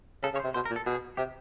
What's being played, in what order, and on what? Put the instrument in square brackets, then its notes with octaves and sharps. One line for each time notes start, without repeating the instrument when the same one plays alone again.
[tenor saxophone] C#3 [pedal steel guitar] A4
[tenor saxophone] C#3 [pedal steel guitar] C#5
[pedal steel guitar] C5
[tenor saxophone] C3
[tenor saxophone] B2 [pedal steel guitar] C5
[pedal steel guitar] A#4
[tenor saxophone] A#2
[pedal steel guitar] A4
[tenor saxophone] B2 [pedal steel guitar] G#4
[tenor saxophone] C3 [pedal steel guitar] G4